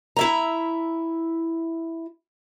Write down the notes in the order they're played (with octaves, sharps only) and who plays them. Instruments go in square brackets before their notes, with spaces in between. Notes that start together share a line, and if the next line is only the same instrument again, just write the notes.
[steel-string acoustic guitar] E4 E5 A#5